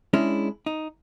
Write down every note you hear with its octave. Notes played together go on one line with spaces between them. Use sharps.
G#3 C#4 D4 E4
D#4